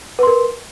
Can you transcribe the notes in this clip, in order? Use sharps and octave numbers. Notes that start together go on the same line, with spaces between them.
A#4 B4 C6